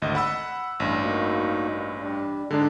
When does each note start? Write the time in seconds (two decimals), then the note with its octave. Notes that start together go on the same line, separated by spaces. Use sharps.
0.02 G#1 D2 D#5
0.15 F#5 B5 E6
0.80 A1 G2
1.02 A#3 D#4 F#4
1.99 G3 D4
2.51 G#2 D3 G#3 D4 A#5